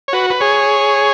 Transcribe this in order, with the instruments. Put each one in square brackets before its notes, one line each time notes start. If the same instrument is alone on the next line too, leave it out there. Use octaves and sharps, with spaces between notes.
[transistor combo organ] C#5
F#4 B4
B4
G#4 C#5